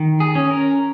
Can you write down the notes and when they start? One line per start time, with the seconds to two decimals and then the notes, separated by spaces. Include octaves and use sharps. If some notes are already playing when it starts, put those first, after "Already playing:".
Already playing: D#3
0.20 G#4
0.35 C#4
0.51 A#4